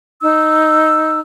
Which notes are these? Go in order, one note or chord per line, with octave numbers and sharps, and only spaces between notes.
D#4 E6